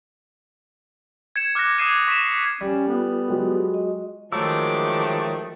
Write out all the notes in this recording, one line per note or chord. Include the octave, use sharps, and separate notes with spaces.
G#6 C#7 E7
D6 F6 F#6 G#6 A#6
D6 D#6 G#6 C7 D#7 E7
C#6 B6 C#7 D#7 E7
C7
G3 C#4
B3 F4 A4
F#3 G#3 G4
D#5
D#3 F3 F#3 G#3 A3 A#5 D6 E6